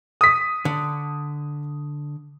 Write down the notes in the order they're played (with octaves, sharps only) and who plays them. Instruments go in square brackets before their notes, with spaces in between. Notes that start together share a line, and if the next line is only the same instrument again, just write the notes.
[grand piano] D#6 B6
[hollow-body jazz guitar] D3